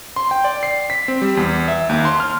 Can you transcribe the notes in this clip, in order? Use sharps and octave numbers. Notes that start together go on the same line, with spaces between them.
C6
G5
D5
C7
B6
C4
G3
E2
E5
D#2
C6
F6